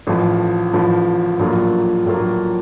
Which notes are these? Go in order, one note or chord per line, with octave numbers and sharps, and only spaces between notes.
A1 A2 F3
A1 A2 F3
A#1 A2 F#3 A#3 F4
A#1 A2 F#3 A#3 F4